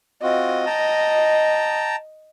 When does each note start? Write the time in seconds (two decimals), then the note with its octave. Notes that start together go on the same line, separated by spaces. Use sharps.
0.23 C4 F4 F#4 D#5
0.66 G5 A5 A#5